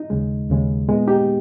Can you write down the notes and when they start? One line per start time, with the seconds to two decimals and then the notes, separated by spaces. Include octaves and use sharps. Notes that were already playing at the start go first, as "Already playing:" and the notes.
Already playing: D#4
0.10 D#2 C#3 G#3
0.49 D#2 C#3 G#3
0.88 A#2 G#3 B3
1.07 D#4 G4